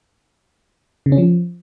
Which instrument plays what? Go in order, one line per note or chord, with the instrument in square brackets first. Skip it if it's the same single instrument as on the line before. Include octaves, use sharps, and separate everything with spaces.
[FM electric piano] C#3
C#4
F3